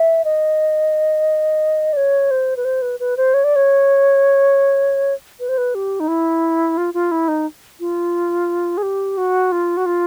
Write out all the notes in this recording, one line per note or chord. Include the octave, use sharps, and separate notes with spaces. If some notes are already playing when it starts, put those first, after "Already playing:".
Already playing: E5
D#5
D5
C#5
C5
B4
C5
B4
B4
C5
C#5
D5
C#5
B4
C5
B4
G4
D#4
E4
F4
F4
E4
D#4
F4
G#4
G4
F#4
F4
F#4
F4